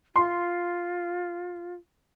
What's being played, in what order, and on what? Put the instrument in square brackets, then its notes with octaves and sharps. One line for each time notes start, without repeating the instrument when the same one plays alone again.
[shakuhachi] F4 [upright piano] C6